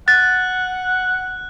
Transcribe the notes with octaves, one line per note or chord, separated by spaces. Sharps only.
F#5 F#6 A6